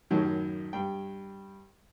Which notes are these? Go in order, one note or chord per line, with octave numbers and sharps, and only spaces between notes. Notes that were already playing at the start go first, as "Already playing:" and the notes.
F#2 A2 D#3 F#3
G2 G5